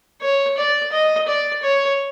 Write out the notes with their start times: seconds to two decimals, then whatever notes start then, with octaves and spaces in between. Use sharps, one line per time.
0.22 C#5
0.58 D5
0.92 D#5
1.28 D5
1.63 C#5